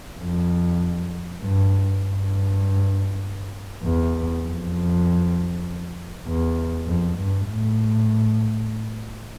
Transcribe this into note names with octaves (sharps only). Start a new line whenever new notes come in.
F2
G2
G2
E2
F2
E2
F2
G2
A2